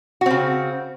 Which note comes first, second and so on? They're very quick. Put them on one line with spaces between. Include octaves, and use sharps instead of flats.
F#4 C4 C#3